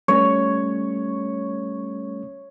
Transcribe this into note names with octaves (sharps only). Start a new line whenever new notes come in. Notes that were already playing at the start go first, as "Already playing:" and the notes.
G3 A3 C#4 C#5